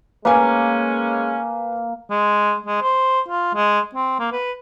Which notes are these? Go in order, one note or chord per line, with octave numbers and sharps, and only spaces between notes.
G#3 A#3 C#4 B4 G#5
G#3
G#3
C5
F4
G#3
C4
A#3
B4